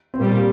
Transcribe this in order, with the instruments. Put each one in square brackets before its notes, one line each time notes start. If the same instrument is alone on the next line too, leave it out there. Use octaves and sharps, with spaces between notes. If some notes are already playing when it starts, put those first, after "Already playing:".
[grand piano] C4
[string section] A#2 G3 [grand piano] A#3